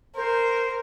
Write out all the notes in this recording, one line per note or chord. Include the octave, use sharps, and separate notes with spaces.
A#4 C5